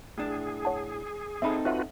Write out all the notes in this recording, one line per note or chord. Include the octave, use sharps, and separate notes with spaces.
A2 D4 G#4
C#5 F#5 A5
C4 D#4 A4 E5 B5
F4 F#4 B4 C#5 E5 F#5